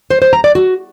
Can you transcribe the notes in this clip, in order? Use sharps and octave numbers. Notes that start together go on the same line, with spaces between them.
C5
C5
A#5
D5
F#4